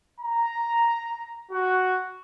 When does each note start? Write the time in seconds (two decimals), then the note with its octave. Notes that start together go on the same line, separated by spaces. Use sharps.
0.20 A#5
1.50 F#4